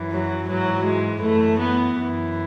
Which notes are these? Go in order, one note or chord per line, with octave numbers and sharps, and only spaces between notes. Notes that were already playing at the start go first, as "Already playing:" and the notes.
Already playing: F#2 E3
F#3
G#2 E3 F#3
G#3
F#2 E3 A3
B3
F#2 E3